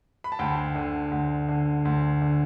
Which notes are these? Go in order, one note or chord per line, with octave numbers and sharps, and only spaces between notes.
B5
A5
D2 G5
D3
D2
D3
D2
D3